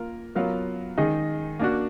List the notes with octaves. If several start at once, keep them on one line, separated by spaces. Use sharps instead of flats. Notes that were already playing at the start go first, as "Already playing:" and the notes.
Already playing: A#3 F4 A#4
F#3 B3 F4 A#4 F5
D#3 G#3 D#4 G#4 D#5
A#3 D4 F#4